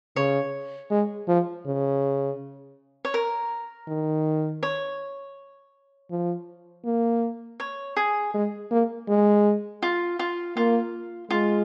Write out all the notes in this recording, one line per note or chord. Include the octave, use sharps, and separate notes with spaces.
C#3 C#5
G#3
F3
C#3
C#5
A#4
D#3
C#5
F3
A#3
C#5
G#4
G#3
A#3
G#3
F4
F4
A#3 F4
G#3 F4